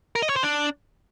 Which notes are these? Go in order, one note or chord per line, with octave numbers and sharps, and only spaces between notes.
A#4
D#5
C#5
C5
D4